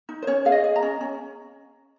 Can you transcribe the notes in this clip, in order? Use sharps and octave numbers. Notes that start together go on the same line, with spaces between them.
D#4
C5
C#4 C#5
G#4 F5
D#5
G#4
A#5
C#4
C#4